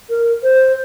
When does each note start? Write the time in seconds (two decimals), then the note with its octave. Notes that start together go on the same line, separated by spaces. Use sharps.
0.10 A#4
0.43 C5